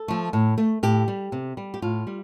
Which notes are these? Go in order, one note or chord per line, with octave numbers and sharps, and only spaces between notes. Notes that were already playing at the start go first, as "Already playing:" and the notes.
Already playing: A4
F3 A3
A2
A3
A2 G4
G3
C3
G3
G4
A2 F4
G3